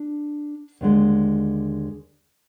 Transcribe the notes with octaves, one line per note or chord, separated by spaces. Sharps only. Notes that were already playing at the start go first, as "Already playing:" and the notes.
Already playing: D4
D#2 D3 G#3